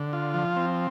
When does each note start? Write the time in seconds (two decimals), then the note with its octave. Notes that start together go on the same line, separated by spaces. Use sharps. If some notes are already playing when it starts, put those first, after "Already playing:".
Already playing: D3
0.13 F4
0.34 F3
0.56 C4